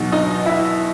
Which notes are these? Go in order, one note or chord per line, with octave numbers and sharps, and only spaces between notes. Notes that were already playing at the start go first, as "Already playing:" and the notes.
Already playing: E2 B2 F#3 D#4
D#4 D#5
E4 E5